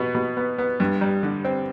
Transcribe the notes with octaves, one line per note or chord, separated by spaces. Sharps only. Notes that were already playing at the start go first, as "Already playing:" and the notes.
Already playing: B2 B3
B2
B3
B3
G2
G3
D3
C4